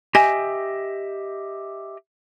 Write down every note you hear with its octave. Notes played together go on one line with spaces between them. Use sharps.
G4 D#5 E5 G#5